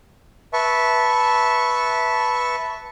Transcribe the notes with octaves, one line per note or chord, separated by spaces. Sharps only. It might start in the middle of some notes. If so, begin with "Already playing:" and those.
B4 E5 A5 C#6